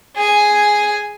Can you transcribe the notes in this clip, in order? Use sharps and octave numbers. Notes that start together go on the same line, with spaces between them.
G#4 G#5